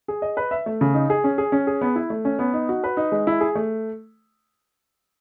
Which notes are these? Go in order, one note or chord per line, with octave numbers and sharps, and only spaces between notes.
G#4
D#5
B4
E5
A3
C#3
D#4
G#4
C#4
G#4
C#4
G#4
B3
E4
A3
C#4
B3
D#4
F#4
B4
D#4
G#3
E4
G#4
A3